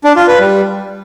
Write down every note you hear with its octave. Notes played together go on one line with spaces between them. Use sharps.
D4
F4
B4
G3